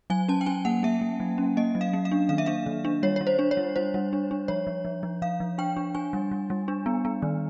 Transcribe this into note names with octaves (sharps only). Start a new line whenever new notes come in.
F#3 G#5
C#4 A5
G5
C#4 G#5
A#3 F#5
A#3 E5
A#3
F#3
C#4
A#3 D#5
F#3
F5
A#3
F5
D4
D#3 F5
E5
D4 F5
D#3
D4
G3 C#5
G3 C#5
C5
D4
C#5
G3
G3 C5
G3
D4
D4
F3 C#5
F3
F3
F3
F3 F5
F3
D4 G5
D4
D4 G#5
G3
G3
G3
D4
B3
B3
D#3